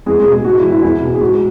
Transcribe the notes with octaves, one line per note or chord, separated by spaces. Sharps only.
E2 G#3 G#4
G#3 G#4
B2
G#3 G#4
G#2 F#4
E4
E3
E4
E2 E4
B2
G#4
G#2 F#4